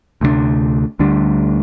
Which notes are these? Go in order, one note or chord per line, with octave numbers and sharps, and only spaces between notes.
D2 C3 G3 D4
D2 D3 G3 D4